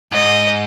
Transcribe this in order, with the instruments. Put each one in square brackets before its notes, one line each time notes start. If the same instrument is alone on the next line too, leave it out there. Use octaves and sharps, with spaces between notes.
[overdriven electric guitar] G#2 [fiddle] D#5